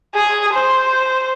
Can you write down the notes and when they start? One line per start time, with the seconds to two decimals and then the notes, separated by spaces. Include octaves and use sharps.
0.15 G#4
0.54 C5